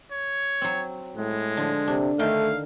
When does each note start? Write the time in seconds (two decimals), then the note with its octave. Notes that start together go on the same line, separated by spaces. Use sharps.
0.11 C#5
0.62 F#3 C4
1.16 A2 G#3
1.57 D3 F3
1.87 C3 D4
2.19 D3 D#3 A3 F5 G5